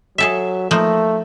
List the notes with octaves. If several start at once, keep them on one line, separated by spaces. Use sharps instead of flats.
F#3 G#4 A4 E5
F3 A3 A#3 D#4